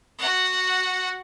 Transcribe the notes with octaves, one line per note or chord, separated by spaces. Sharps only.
F#4 F#5